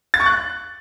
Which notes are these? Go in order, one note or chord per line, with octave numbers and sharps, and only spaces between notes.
A6
C#6
F#6